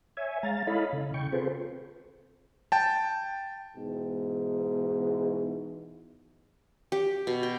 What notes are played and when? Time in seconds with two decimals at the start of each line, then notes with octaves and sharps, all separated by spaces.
0.17 C#5 E5 G#5
0.43 G#3 F5 A#5 A6
0.67 E4 A4 C#5 D#5 F5 B5
0.93 C#3
1.14 C#3 G5 C#6
1.32 C4 F4 G#4 A4 B4 C5
2.72 G5 A5
3.76 G#2 B2 E3
6.92 G4
7.27 B2
7.43 G5